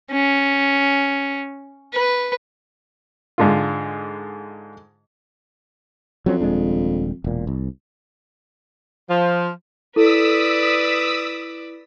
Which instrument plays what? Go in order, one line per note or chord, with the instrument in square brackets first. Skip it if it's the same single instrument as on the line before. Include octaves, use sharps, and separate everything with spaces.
[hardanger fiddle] C#4
B4
[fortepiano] G#2 D3 F4
[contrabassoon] F2 [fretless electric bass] F#3 C4 C#4
[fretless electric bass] D#1 G#3 D4
E1 A#2
C2
[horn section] F3
[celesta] E4 [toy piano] A4 [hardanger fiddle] B4 D5 [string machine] D#6 E6 B6